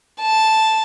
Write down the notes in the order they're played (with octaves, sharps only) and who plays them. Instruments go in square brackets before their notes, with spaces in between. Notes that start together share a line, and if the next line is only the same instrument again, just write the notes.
[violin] A5